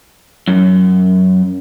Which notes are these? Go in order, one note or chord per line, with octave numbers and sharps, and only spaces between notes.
F#2